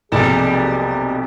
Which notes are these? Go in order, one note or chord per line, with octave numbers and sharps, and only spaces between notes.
B1 F2 C3 G3 A#3 G#4 A4